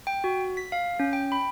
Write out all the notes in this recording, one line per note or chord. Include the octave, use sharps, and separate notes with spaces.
G5
F#4
B6
F5
C#4
G5
B5